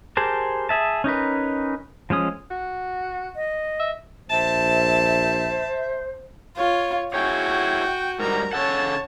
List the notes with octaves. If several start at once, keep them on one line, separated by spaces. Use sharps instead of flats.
G4 G#4 A#4 C5 A5
G#4 E5 A5
C#4 D#4 A#4 B4
F3 G#3 C#4 D#6
F#4
D#5
E5
A#1 C5 E5 A5
F4 C#5
E4 F#4 G#4 C#5 G5
G#2 G3 A#4 A#5
C#3 A4 C#5 F#5 A5